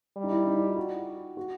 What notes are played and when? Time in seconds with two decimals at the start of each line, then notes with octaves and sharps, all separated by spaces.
0.17 G3
0.24 D#4
0.32 E4
0.47 D#4
0.57 E4
0.67 F4
0.77 F#4
1.37 F#4